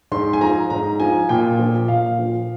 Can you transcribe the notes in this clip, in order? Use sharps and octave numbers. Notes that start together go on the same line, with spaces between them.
G#2 C6
G#5
F3 A#5
G#2 A#5
F3 G#5
A#2 G5
F3
A#2 F5
F3